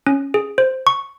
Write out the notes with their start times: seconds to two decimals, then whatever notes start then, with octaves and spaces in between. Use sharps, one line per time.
0.07 C#4
0.34 G#4
0.58 C5
0.87 C#6